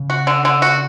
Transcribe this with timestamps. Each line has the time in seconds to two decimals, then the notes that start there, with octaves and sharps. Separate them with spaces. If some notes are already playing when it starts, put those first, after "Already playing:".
Already playing: C#3
0.10 F#4
0.27 D3
0.45 D3
0.62 F#4